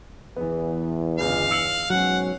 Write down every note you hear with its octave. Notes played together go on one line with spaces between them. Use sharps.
E2 E3 B3
G1 C#2 E3 F5
E6 C#7 F#7
G#2 B2 F#3 C#4 F#5